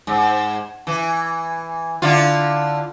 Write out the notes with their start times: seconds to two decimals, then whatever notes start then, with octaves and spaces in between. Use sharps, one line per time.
0.07 G#2
0.87 E3
2.02 D3 E4 F4